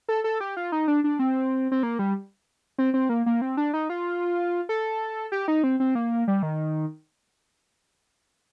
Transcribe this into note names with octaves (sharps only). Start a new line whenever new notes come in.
A4
A4
G4
F4
D#4
D4
D4
C4
C4
A#3
G3
C4
C4
A#3
A#3
C4
D4
D#4
F4
A4
G4
D#4
C4
C4
A#3
G3
D#3